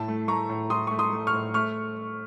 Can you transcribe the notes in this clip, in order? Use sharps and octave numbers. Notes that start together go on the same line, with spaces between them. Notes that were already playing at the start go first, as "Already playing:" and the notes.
Already playing: A2 A5
A3
A3 A#5 C#6
A2
A2 C6 D#6
A3 C#6
C6 D#6
A3
C#6 F6
A2
A3 C#6 F6